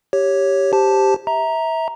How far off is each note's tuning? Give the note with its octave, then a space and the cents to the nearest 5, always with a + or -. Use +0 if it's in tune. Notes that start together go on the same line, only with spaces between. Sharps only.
G4 +0 C#5 +0
G4 +0 C5 +0 A5 +0
E5 -25 A#5 +0